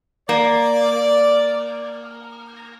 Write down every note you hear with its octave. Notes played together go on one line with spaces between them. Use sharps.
A#3 D5